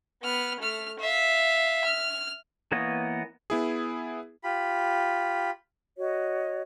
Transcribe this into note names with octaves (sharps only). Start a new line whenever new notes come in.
B3 F6
A3 F6
E5 F5
F6
E3 A#3 B3 C#5 D#5
B3 E4 G#4
F4 G4 B5
F#4 C#5 D#5